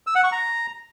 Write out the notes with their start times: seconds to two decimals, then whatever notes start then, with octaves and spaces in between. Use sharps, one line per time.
0.07 E6
0.15 F#5
0.24 C#6
0.32 A#5